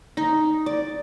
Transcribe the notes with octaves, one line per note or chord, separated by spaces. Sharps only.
D#4
D5